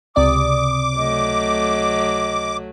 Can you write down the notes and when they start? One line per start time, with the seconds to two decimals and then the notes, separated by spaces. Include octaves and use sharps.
0.16 C#2 C3 D5 D6 D#6
0.97 F#3 A3 D#5